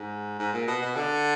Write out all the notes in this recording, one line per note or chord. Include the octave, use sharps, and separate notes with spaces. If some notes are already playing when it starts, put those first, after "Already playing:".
Already playing: G#2
G#2
A#2
B2
B2
D3